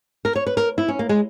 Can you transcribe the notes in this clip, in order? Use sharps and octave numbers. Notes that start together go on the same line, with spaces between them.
A#4
C#5
B4
A#4
E4
C#4
A#3
G#3